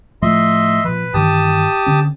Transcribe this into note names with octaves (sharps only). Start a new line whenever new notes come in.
A2 F3 A3 D#5 E5 C6
A#2 F3 B4
G2 D#3 E3 G4 A5 D#6
D3 C#4